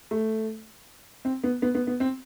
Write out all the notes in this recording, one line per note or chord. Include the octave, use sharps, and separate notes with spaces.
A3
C4
B3
B3
B3
B3
C4